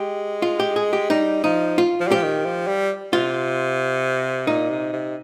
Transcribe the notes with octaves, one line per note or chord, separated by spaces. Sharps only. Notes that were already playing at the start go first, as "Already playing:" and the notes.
Already playing: G#3 G4
F4
G4
G#4
G4
G3 D#4
F3 D#4
F4
F3
G3
F3 G4
D#3
F3
G3
C3 F4
A#2 D#4
C3
C3